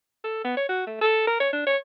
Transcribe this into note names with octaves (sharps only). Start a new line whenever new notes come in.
A4
B3
C#5
F#4
A3
A4
A#4
C#5
D4
C#5